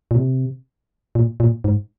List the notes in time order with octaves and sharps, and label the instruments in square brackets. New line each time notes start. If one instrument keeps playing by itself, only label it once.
[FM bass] A#2
C3
A#2
A#2
G#2